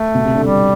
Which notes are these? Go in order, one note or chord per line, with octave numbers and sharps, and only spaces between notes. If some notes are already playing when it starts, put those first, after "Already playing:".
Already playing: A3
B2
C3
D3
G3